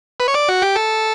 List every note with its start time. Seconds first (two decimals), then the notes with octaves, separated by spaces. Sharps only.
0.20 B4
0.28 C#5
0.34 D5
0.49 F#4
0.62 G4
0.76 A4